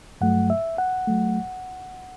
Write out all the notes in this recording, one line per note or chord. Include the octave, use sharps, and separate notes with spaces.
G2 F#3 A3 F#5
E5
F#5
F#3 A3